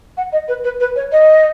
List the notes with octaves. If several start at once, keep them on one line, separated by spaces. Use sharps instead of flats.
F#5
D#5
B4
B4
B4
C#5
D#5